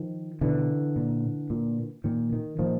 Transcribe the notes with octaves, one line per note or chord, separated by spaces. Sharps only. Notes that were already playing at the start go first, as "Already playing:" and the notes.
Already playing: D#3 F3
B2 D3 E3
A#2
A#2
A#2 D#3
D#3
A#2 D#3 F3